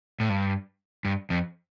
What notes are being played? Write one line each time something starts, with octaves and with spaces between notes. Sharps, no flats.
A2
G2
G2
F2